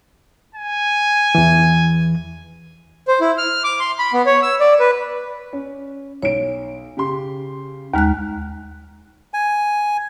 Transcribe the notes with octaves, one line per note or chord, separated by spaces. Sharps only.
G#5
E2 E3
C5
E4
F6
D6
C6
B5
B3
C#5
E6
D5
B4
C#4
B1 C#5 D7
C#3 G4 C6
D#2 G#3 A#5 F6 F#6
G#5